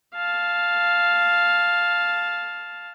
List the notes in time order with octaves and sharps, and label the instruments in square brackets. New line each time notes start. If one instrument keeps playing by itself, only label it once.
[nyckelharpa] F5 A5